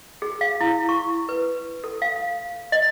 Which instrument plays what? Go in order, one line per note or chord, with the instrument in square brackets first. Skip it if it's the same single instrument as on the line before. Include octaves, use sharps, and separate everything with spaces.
[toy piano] G#4
F5
E4
C#6
B4
A4
F5
D#5